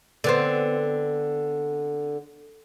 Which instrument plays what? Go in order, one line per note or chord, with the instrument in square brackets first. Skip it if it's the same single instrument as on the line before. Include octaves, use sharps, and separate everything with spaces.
[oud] D3 B3 C4